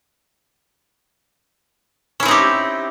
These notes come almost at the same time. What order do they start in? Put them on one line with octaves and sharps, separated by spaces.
C#4 E4 C4 D#4 G4